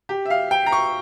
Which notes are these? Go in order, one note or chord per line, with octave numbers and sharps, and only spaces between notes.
G4
E5
F5
G5
A#5
C#6